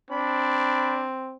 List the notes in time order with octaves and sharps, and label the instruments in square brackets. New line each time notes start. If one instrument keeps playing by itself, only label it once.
[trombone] C4 [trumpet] D4 [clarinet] B5